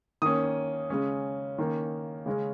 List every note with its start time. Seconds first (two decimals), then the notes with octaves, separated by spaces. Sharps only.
0.22 D#3 A#3 C#4 D#6
0.90 C#3 G#3 C#4
1.58 D#3 A#3 C#4
2.26 C#3 G#3 C#4